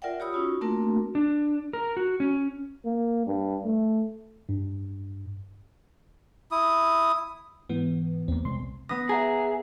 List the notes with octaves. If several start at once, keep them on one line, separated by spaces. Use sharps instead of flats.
F4 A#4 D5 E5 F#5 G5
F4 G4 C#5 B5 D#6 E6
C#4 D#4 F4 F#4
A3 A#3 C4 D4 F#4 A#4
D4
A#4
F#4
C#4
A#3
G2
A3
G2
E4 D#6
G#2 E3 B3
E2 A#3 C4
B1 C3 G#3 B3 C6
B3 D#6 A#6
G#4 E5 F#5 A#5